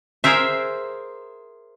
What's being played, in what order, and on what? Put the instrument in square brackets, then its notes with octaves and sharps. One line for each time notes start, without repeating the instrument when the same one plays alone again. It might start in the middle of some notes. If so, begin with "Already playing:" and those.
[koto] G#4 A#4 C5 E5